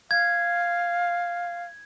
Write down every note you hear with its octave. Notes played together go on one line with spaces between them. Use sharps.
F5 G#6